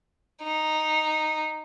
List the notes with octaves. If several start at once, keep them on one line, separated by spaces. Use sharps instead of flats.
D#4